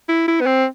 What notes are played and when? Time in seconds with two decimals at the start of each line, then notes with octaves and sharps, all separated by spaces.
0.09 E4
0.27 E4
0.41 B3
0.46 C4